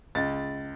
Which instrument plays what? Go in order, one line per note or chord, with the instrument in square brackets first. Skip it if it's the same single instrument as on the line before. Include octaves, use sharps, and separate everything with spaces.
[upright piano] C#2 A6